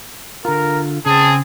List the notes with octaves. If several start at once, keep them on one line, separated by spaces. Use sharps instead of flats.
D3 F4 A#4
C#3 C4 G#4 A5